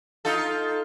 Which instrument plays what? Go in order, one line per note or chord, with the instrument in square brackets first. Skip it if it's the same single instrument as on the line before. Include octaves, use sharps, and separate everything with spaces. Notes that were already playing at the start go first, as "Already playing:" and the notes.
[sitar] D#4 F4 A4